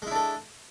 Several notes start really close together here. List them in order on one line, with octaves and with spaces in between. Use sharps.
G#3 E4 D4 A4